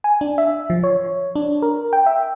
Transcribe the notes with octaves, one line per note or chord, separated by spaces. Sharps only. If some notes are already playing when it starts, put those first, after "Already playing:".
G#5
D4
E5
F3
C#5
D4
A#4
G5
E5